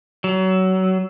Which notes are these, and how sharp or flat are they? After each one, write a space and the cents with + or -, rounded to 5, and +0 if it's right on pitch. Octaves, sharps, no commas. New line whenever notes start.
F#3 +25